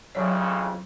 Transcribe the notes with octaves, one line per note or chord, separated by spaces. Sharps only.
A1 F2 C#3 F#3 C#5 D5